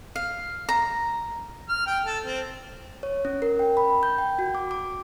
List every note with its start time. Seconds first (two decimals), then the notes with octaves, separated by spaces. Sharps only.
0.16 F5
0.69 A#5
1.69 F6
1.86 G5
2.04 A4
2.25 C4
3.03 C#5
3.25 C#4
3.42 A#4
3.59 G5
3.77 B5
4.03 G6
4.18 G5
4.39 F#4
4.55 D6
4.71 D6